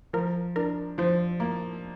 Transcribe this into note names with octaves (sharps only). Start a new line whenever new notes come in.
F3 A#4
D4 A#4
F3 C5
A#3